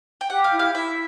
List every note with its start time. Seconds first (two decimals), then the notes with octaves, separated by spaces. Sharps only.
0.21 G5
0.30 G4 F#5
0.44 F5
0.52 E4
0.59 F5
0.74 E4 E5